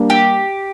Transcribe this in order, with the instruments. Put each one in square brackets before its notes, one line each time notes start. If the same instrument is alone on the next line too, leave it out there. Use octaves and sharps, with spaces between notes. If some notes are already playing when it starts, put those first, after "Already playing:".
Already playing: [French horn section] G3 A#3 D4
[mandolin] G4